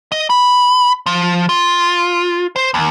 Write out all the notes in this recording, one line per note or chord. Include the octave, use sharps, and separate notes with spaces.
D#5
B5
F3
F4
C5
D#2